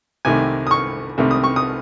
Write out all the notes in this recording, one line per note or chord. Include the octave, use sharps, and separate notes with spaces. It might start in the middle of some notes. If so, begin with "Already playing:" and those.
C2 C3 D#3 A3 G#5
D#6
C#6
C2 C3 D#3 A3
D#6
C#6
D#6